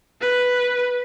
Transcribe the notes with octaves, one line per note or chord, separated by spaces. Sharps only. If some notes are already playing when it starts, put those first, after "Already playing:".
B4